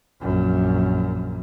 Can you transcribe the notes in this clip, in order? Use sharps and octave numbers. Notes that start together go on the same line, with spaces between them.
A#1 F#2